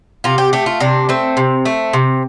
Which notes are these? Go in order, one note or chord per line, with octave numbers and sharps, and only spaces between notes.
C3 F4
G4
A3 G4
F4
C3 D4
A3 C4
C3
A3
C3